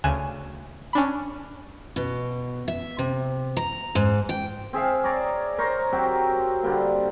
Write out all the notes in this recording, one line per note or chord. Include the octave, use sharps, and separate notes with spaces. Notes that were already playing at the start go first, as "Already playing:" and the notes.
D2 C#3 G#5 F#6 E7
C#4 D4 B5
B2
E5
C3
A#5
G#2
G5
C4 G#4 E5 F5
C#5 D5 A#5 D6
A#4 C5 C#5 A#5
F#3 C4 F#4 G4
D3 G3 A#3